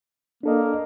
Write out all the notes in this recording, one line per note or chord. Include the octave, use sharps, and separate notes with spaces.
A#3 D4 A4 D#5